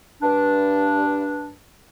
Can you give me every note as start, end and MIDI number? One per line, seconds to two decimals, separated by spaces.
0.23 1.54 43
0.23 1.54 62